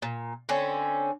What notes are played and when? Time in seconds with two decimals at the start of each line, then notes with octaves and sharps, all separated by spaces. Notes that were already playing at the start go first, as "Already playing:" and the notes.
0.02 A#2
0.49 D3 C4 C#4